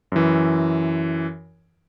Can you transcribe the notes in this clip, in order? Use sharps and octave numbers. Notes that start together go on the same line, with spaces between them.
F#2 E3